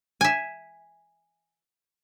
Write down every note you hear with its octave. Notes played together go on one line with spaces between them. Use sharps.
E5 G#5